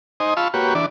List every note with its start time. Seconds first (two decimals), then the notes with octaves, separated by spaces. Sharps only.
0.20 D#4 C5 D#5 G#5
0.37 F4 F5 A5 B5 C#6 E6
0.54 A#3 F#4 G4 B4 C#5
0.75 E3 D4 D5